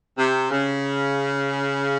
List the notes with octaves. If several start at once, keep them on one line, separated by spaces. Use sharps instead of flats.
C3
C#3